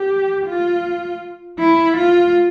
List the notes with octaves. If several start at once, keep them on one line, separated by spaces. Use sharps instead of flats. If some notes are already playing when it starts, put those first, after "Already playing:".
Already playing: G4
F4
E4
F4